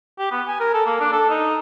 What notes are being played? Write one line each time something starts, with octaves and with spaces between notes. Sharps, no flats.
G4
B3
G#5
A#4
A4
A#3
D4
A4
D#4